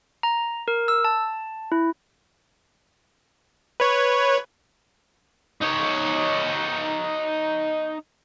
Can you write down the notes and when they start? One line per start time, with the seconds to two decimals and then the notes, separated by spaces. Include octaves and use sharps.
0.23 A#5
0.68 A#4
0.88 E6
1.05 A5
1.72 E4
3.80 B4 C#5
5.61 D#4 C#5